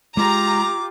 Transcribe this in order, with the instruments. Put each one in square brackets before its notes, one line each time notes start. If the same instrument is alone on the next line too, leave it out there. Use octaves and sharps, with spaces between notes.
[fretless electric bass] G#3 [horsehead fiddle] F4 G4 [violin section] A#5 [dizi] D6